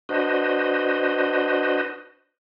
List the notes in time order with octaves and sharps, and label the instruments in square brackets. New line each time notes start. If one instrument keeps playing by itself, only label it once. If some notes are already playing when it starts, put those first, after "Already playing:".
[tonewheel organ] D4 F#4 B4 C5 D#5